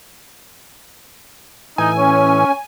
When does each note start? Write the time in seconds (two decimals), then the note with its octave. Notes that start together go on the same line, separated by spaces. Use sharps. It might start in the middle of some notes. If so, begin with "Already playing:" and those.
1.78 A2 E3 D#4 G#5
1.98 C#4 C#5